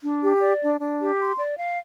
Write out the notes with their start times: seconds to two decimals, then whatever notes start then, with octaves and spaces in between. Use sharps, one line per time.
0.02 D4
0.22 G4
0.41 D5
0.61 D4
0.80 D4
1.00 G4
1.20 C6
1.39 D5
1.58 F5